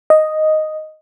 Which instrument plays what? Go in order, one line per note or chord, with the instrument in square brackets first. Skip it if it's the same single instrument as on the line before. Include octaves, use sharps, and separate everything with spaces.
[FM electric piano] D#5